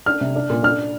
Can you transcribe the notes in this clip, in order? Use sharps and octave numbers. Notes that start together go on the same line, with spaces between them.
D4 F6
C3
D4
A#2
D4 F6